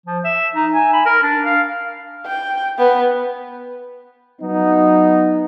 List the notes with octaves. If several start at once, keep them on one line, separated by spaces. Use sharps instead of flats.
F3
E5
D#4
G#5
B5
A#4
D4
F5
G5
B3
F#3 B3 D#4